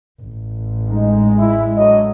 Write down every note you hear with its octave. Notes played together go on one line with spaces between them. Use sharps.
A1
G#3 D#4
E4
D3 F#3 D#5